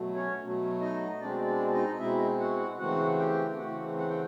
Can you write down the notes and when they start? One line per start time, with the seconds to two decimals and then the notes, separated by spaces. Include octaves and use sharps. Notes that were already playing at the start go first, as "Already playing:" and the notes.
Already playing: B2 F#3 A3
0.14 C#4 C#5
0.41 B2 F#3 A3
0.81 D#4 D#5
1.20 B2 G#3 C4 D4 D5
1.47 D4 D5
1.73 D#4 D#5
1.99 B2 G#3 C4 E4 E5
2.39 F#4 F#5
2.78 C#3 E3 A3 C4 F#4 F#5
3.19 G4 G5
3.57 C#3 E3 A3 C4 F#4 F#5
3.98 F#5
4.09 G5